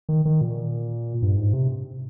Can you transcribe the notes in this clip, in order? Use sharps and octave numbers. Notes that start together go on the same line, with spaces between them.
D#3
D#3
A#2
G2
G#2
C3